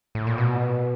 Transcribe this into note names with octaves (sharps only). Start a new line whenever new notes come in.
A2
A#2
B2